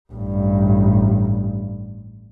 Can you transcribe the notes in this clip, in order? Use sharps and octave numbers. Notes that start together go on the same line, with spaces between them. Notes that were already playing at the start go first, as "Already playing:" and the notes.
A1 G2